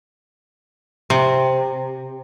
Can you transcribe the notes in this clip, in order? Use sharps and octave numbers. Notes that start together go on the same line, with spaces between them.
C3